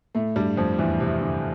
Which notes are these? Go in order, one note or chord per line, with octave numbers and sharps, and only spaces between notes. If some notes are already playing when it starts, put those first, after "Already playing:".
A2 A3
G2 G3
F2 F3
E2 E3
C3
D3